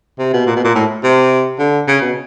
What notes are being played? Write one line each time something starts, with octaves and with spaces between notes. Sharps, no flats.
C3
B2
A#2
B2
A#2
A2
C3
D3
C#3
B2